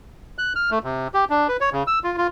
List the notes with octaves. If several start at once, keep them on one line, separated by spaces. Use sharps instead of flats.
F#6
F6
A3
C3
G4
D4
B4
C#5
C#3
E6
F4
F4